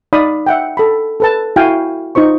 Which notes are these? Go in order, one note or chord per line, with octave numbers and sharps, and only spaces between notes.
D#4 D5 F5 B5 D#6
E5 F#5 G5
A4 B5
A4 B4 A5
E4 F#4 F5 G5 G#5
D#4 F4 C5 C#6